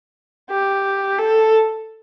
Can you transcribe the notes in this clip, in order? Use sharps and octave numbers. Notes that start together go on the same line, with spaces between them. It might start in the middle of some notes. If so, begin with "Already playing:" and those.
G4
A4